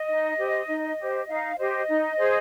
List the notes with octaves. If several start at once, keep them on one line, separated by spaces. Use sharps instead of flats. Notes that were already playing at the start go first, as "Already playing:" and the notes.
Already playing: D#5
D#4
G4 C5
D#4
G4 C5
D#4 F5
G4 C5 D#5
D#4
G#4 C5